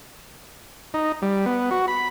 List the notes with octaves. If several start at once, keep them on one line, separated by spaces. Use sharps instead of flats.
D#4
G3
B3
F#4
B5